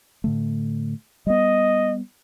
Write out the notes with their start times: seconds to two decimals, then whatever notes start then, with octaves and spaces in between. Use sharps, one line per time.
0.24 A2 D3 A3
1.27 G3 B3 D#5